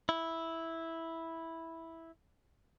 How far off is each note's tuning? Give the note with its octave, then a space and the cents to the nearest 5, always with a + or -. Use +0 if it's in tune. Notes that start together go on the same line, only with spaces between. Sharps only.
E4 -5